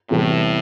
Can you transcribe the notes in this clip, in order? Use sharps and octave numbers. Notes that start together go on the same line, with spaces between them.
E2 A2 C3 E3 G3